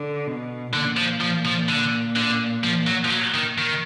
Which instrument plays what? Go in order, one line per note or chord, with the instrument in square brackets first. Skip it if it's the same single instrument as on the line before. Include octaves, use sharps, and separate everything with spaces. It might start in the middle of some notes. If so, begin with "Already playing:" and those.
Already playing: [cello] D3
B2
[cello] A#2 [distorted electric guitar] D3
[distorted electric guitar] F3
F3
F3
D3
D3
F3
F#3
F3
F#3
D#3
D#3